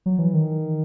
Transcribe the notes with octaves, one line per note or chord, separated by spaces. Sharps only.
F#3
E3
D#3